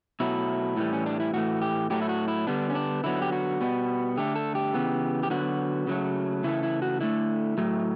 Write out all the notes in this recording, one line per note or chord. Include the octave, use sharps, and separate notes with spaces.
B2 F#3 A3 E4
A2 E3 G3
C#4
D4
E4
A2 E3 A3 F#4
G4
A2 F#3 A3 G4
E4
F#4
E4
D3 G3 B3 D4
C#4
D4
D3 F#3 B3 E4
G4
F#4
B2 G3 B3
D3 A3 G4
A4
G4
C#3 E3 B3
G4
D3 F#3 B3 F#4
C#3 F#3 A3
C#3 E3 A3 E4
E4
F#4
D3 A3 E4
A2 F#3 A3